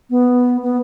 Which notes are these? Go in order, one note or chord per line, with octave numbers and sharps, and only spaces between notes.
B3
B3